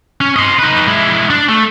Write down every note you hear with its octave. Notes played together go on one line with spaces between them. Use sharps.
C#4
C5 D#5
D#4 B4
G#3 E4
D4
A3